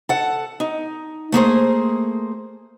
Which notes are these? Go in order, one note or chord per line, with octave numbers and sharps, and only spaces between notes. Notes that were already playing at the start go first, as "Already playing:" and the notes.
A4 F#5
D#4
A3 A#3 G#4 C5